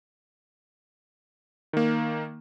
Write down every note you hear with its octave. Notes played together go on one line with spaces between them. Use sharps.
D#3 A#3